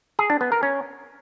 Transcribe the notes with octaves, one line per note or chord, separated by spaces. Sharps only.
G#4
D4
B3
A#4
C#4